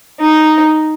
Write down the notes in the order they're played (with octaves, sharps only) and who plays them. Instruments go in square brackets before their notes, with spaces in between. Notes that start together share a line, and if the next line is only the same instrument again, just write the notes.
[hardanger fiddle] D#4